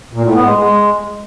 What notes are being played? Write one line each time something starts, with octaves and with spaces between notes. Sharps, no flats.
A#2
A2
B3
G#3
G#3